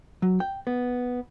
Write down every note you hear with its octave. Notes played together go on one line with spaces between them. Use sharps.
F#3
G5
B3